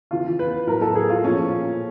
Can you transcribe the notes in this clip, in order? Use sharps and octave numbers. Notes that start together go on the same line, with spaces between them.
C#3 E3 F4
B4
A2 F#3 A#4
A4
G#4
F4
A#2 F3 C#4